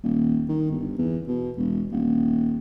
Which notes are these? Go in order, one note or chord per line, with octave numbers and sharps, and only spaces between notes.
D#1
D#3
G1
E2
B2
E1
D#1